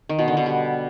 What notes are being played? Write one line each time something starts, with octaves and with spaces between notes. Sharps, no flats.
D#3
B2
D3
B2
G3